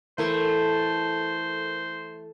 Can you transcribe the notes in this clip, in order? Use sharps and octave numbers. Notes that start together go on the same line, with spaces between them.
E3 A3 E4 A4 A#4 C5 C#6